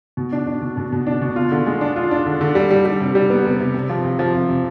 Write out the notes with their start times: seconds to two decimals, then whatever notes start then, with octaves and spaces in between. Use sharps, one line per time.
0.17 B2
0.32 D4
0.47 D4
0.62 B2
0.77 B2
0.92 B2
1.07 D4
1.22 B2
1.36 F4
1.51 D3
1.66 G#3
1.81 D4
1.96 F4
2.11 D4
2.26 D3
2.41 D3
2.55 G3
2.71 G3
2.85 G3
3.00 C3
3.15 G3
3.30 B3
3.45 C3
3.60 C3
3.74 C3
3.89 F3
4.04 C3
4.19 F3
4.34 C3
4.49 C3